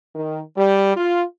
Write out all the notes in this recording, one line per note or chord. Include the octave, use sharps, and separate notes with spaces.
D#3
G3
F4